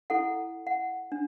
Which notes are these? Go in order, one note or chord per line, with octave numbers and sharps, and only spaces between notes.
E4 A4 F#5
F#5
D4